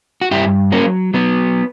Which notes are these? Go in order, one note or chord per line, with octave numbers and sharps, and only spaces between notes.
F#4
G2 E4 G4
F#3 A#3 C#4
F#3 B3